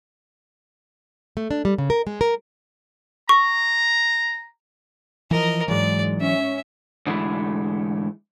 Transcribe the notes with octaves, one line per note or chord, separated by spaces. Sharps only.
A3
D4
G3
C#3
A#4
G#3
A#4
A#5 C#6
E3 F3 A#4 D#5
G#2 E3 F#3 G#3 D5
C#4 E5
G#2 D3 E3 G#3 A3 E4